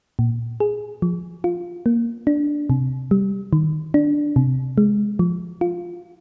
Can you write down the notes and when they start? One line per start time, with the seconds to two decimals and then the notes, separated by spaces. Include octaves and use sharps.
0.19 A#2
0.60 G#4
1.02 F3
1.44 F4
1.86 A#3
2.27 D4
2.70 C3
3.11 G3
3.53 D#3
3.94 D4
4.36 C3
4.78 G#3
5.19 F3
5.61 F4